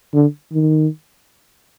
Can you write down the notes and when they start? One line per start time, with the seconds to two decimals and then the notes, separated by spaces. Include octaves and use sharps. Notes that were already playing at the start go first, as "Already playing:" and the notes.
0.13 D3
0.53 D#3